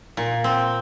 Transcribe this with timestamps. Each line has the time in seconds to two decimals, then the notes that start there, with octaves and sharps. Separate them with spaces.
0.17 A#2
0.44 C4